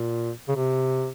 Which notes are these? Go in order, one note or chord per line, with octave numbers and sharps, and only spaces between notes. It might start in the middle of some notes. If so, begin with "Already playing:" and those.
Already playing: A#2
C#3
C3